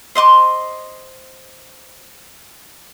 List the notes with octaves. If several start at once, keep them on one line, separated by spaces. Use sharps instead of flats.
C5 D#5 C6 D6